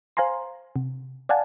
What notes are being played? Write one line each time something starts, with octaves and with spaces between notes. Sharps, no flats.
C5 F5 G#5 A#5 C6
C3
D5 F5 F#5 G#5 A5